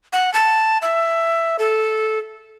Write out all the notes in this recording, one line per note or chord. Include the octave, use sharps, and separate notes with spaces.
F#5
A5
E5
A4